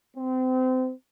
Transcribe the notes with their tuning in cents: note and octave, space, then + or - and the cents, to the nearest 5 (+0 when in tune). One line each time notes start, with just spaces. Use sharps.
C4 -30